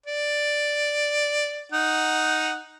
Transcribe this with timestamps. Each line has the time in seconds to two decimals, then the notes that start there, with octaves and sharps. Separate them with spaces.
0.06 D5
1.72 D#4 F#5